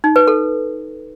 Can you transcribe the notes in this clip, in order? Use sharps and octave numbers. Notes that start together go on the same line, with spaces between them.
D#4
B4
A4